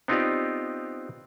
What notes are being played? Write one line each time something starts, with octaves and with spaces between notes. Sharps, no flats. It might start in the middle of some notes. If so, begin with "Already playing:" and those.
B3 C4 D#4 F4 G4 D5